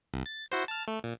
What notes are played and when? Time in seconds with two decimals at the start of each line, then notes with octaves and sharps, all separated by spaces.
0.14 C2
0.26 A6
0.52 E4 F#4 C5
0.68 A5 F6
0.88 A3
1.04 A#2